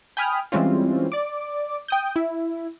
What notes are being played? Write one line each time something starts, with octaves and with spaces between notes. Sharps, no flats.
G5 G#5 B5 D#6 F6
E3 G3 G#3 C4 C#4 F4
D5 D6
G5 D#6 G6
E4